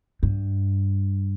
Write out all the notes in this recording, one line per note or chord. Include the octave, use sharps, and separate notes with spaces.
G2